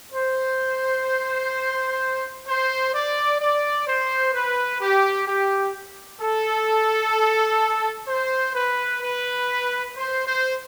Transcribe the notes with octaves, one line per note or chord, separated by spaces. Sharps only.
C5
C5
D5
D5
C5
B4
G4
G4
A4
C5
B4
B4
C5
C5